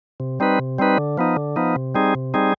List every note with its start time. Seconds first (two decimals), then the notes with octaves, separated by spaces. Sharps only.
0.20 C3
0.40 G3 C4 D#4 B4
0.59 C3
0.79 G3 C4 D#4 B4
0.98 D3
1.18 F3 B3 D#4
1.36 D3
1.56 F3 B3 D#4
1.76 C3
1.95 G3 C4 D#4 G#4
2.15 C3
2.34 G3 C4 D#4 G#4